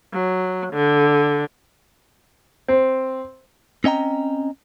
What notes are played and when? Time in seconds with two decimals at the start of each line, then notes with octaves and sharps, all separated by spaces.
0.13 F#3
0.73 D3
2.68 C4
3.84 C4 C#4 D#5 G5 A#5